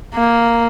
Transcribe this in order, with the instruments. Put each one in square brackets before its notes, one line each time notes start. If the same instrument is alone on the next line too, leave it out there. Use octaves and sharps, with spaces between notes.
[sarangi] A#3